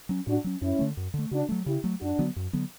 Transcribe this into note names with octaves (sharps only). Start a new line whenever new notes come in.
F#3 C#4
A2 D4 F#4
F#3 C#4
F#2 C#4 E4
D3 A3
F#2
D3 A3
C#3 D4 F#4
F#3 A3
C#3 E4 G4
F#3 A3
F#2 D4 F#4
D3 F#3 B3
F#2
D3 F#3 B3